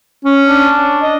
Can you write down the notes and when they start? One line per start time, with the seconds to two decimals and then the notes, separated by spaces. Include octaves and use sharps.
0.25 C#4
0.48 D4
1.02 D#5